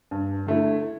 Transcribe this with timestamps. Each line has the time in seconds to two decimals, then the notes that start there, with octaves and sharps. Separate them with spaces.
0.11 G2
0.47 D3 A3 E4